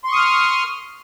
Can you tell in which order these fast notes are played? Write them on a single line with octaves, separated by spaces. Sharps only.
C6 C#6 D#6 F6